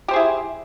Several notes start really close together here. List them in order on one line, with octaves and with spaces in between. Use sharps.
G4 C5 G#4 E4